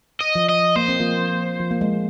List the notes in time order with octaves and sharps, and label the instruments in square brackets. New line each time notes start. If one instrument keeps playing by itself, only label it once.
[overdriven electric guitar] D#5
[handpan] F3
[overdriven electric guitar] D#5
[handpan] A#3 [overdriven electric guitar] C5
[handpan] C4
F3 A#3
F3
A#3
G#3